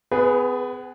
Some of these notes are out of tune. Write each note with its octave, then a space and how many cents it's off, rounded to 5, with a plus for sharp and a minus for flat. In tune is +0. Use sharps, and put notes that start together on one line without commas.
B3 +40 G#4 +0 B4 +0